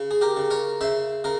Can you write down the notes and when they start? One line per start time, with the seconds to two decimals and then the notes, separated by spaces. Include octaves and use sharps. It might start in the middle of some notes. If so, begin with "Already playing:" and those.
Already playing: C#3
0.11 G#4
0.21 G4 A#4
0.37 C#3
0.51 A#4 C#5
0.81 C#3 C5 E5
1.24 C#3 A#4